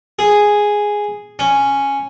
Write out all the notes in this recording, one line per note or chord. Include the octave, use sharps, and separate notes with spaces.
G#4
C#4